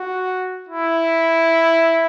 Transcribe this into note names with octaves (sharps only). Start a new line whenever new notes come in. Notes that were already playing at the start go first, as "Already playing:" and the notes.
Already playing: F#4
E4